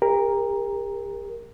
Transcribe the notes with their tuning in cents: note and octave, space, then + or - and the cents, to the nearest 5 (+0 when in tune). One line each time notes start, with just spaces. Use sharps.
G4 +40 A#4 +0